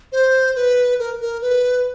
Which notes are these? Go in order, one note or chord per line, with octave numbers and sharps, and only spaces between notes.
C5
B4
A#4
A#4
B4